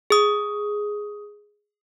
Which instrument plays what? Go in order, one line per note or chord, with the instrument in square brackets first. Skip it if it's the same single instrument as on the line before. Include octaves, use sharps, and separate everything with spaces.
[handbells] G#4 D#6